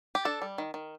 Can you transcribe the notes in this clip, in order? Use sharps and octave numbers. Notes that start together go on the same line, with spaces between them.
G4
D4 A4
G3
D#3
D#3